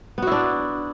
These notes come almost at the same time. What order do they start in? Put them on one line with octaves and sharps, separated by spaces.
B3 F#4 E4 D4